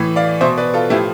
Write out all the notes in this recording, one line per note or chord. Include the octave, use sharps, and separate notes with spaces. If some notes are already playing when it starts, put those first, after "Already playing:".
Already playing: A2 E3
D5 F5
B2 C5 E5
B4 D5
F4 A4
A2 F3 E4 G4